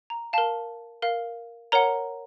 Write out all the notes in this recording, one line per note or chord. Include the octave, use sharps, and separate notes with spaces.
A#5
A#4 F5 A5
A#4 F5
A#4 C#5 F#5 A#5